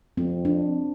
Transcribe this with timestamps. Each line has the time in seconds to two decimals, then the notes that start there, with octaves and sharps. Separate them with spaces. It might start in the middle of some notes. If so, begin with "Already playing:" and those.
0.17 F2 C4
0.45 D4